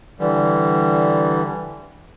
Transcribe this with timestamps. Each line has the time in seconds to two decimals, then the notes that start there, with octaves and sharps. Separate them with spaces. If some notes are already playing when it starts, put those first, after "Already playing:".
0.19 D3 E3 G3